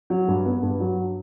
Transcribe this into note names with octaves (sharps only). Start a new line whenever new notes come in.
F#3
G2
B3
G2
F#3